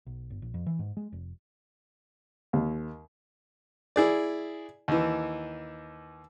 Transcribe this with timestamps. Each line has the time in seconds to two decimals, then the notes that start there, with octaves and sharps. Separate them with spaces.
0.07 B1
0.30 G1
0.42 A#1
0.54 F2
0.67 E3
0.79 G#2
0.97 G#3
1.13 F1
2.53 D#2
3.96 E4 G#4 D5
4.88 D#2 E3